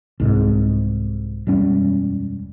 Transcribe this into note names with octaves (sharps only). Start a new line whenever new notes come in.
C2 G#2
E1 F#2 G3 C#4